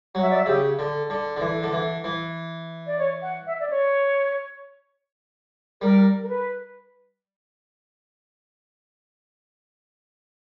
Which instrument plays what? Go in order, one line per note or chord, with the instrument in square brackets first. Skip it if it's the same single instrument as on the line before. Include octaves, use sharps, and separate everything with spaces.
[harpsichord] F#3 [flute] F#5
[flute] E5
D5
E5
[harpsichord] C#3 [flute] G4
[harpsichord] D3
D3
D3
E3
D3
E3
E3
[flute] D5
C#5
F#5
E5
D5
C#5
[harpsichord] G3 [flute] A#4
[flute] A#4
B4